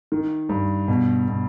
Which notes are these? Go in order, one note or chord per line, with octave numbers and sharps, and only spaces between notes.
D#3
G2
B2
B2